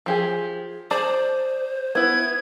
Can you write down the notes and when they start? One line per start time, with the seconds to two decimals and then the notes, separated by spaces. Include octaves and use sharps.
0.06 F3 G4 G#4
0.91 G#4 C5 D5 A5
1.95 B3 E4 G#6